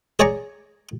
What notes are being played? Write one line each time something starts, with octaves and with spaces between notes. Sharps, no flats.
G#4 C#5 D5 G#5 A#5 C#6